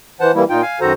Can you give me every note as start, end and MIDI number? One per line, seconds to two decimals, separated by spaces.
0.20 0.31 52
0.20 0.31 72
0.20 0.31 78
0.20 0.31 81
0.35 0.44 52
0.35 0.44 55
0.35 0.44 58
0.35 0.44 64
0.50 0.62 46
0.50 0.62 63
0.50 0.62 65
0.50 0.62 79
0.62 0.80 77
0.62 0.80 80
0.81 0.93 42
0.81 0.93 51
0.81 0.93 66
0.81 0.93 69
0.81 0.93 72
0.81 0.93 82